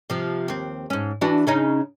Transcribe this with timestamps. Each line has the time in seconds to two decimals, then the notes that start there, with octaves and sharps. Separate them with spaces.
0.10 C3 F3
0.48 D#2 C4
0.90 G#2 C#4
1.21 E3 D4 F#4
1.47 C#3 C#4 D#4